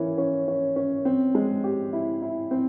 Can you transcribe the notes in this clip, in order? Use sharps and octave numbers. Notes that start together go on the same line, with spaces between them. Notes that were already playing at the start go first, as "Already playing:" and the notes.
Already playing: E3 A#3 C#4
C#4
C#4
C#4
C4
G#3
G4
E4
E4
C4